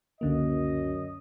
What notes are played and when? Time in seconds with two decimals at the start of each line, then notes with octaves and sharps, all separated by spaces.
0.21 C#2 F#2 D3 A#3 D#5